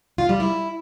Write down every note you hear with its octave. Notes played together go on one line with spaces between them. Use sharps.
F4
G3
E4